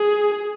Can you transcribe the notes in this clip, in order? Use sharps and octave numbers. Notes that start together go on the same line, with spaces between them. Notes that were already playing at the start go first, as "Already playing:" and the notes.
Already playing: G#4